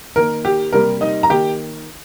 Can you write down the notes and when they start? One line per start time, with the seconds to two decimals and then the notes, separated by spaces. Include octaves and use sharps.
0.16 D#3 A#3 A#4
0.45 G4
0.73 C3 G3 A#3 A#4
1.01 D#4 D#5
1.23 A#5
1.30 D#3 A#3 G4 G5